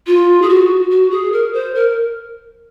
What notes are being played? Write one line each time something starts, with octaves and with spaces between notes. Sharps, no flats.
F4
G#4
F#4
F#4
G#4
A#4
C5
A#4